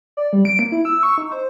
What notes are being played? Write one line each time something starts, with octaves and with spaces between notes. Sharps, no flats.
D5
G3
D7
A#3
E4
E6
C#6
D#4
C5